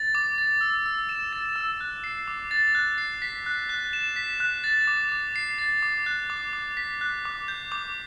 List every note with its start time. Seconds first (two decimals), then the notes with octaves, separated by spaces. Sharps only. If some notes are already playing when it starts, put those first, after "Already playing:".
Already playing: A6
0.15 D6
0.38 A6
0.61 E6
0.86 E6
1.09 E7
1.33 A6
1.56 E6
1.81 F#6
2.04 C7
2.28 D6
2.51 A6
2.75 F#6
2.98 C7
3.22 B6
3.46 F#6
3.69 F#6
3.93 E7
4.16 B6
4.40 F#6
4.64 A6
4.87 D6
5.12 D6
5.36 C7
5.58 A6
5.83 D6
6.06 F#6
6.30 D6
6.53 D6
6.77 B6
7.01 F#6
7.25 D6
7.48 G6
7.72 D6